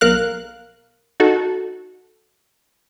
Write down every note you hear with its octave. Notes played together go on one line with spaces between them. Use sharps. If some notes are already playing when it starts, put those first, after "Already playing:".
B1 A#4 F5 F#6
D#4 F#4 A4